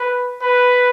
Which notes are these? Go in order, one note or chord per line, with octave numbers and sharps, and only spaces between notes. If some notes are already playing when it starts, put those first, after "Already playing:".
Already playing: B4
B4